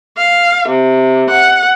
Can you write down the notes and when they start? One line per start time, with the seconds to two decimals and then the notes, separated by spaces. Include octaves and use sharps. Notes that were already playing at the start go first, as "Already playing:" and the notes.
0.18 F5
0.69 C3
1.30 F#5